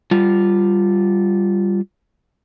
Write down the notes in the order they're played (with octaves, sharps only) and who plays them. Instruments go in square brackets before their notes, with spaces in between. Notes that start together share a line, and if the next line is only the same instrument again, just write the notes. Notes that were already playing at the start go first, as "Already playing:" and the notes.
[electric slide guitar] G3 F4